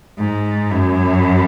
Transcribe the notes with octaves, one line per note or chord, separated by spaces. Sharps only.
G#2
F#2